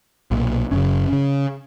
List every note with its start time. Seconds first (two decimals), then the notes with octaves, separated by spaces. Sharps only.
0.31 B1 A#2
0.71 F#1 F#2 C#3 C#4
1.13 C#3